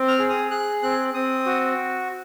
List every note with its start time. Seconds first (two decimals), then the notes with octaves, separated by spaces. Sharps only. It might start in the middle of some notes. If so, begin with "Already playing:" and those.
Already playing: C4
0.08 F6
0.19 G#4
0.30 D#6
0.51 G#4 F#6
0.82 C4 F#6
1.14 C4 D#6
1.46 F#4